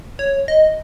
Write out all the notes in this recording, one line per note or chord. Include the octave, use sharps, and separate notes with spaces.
C#5
D#5